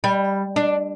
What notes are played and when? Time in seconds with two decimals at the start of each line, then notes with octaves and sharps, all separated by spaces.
0.04 G3
0.56 D4